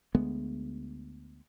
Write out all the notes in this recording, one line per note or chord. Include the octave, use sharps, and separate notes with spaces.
D2 G#3 B3